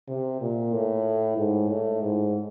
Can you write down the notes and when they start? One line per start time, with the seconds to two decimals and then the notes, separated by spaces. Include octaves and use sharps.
0.08 C3
0.41 A#2
0.73 A2
1.37 G#2
1.69 A2
2.01 G#2